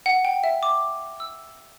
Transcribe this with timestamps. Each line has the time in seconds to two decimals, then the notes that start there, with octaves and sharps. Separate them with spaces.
0.06 F#5
0.25 G5
0.44 E5
0.63 D6
1.20 E6